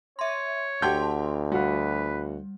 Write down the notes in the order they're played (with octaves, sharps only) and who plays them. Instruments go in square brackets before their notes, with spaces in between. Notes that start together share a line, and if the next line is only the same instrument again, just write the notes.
[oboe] C#5 [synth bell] E5 C6
[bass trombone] D2 [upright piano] G4 G5 G6 [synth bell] F#5 A5 C6
[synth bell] G3 [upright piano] F#4 F5 [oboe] B4